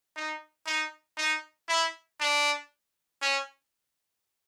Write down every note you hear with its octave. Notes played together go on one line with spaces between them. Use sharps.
D#4
D#4
D#4
E4
D4
C#4